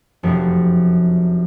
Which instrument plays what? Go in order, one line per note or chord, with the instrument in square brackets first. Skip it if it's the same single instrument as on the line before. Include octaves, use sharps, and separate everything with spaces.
[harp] F1 F#2 F3 B5